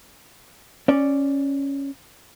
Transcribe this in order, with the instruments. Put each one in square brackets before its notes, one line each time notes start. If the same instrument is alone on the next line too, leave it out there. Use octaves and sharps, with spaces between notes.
[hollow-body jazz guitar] C#4 D5